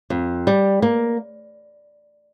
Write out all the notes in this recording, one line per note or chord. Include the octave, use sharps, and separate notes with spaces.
F2
G3
A#3